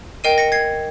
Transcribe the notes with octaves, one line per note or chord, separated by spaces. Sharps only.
A#4 D#5 G5 C7 D#7
A#6 C#7
G#6 C7